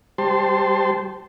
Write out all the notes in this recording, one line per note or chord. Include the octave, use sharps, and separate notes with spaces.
G3 G4 C5 A5 C6